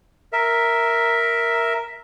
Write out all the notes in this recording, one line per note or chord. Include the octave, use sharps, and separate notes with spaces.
A#4 E5